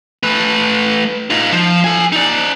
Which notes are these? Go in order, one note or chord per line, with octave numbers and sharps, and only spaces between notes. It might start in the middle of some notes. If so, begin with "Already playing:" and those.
A3 B4
D#4 F4
F3
A4 G#5
D#4 D5